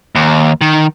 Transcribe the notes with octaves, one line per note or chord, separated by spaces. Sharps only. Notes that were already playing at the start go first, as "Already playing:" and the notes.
D#2
D#3